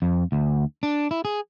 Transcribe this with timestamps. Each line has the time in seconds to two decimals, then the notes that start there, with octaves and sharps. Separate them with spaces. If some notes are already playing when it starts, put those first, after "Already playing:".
0.02 F2
0.32 D2
0.83 D4
1.11 E4
1.25 G#4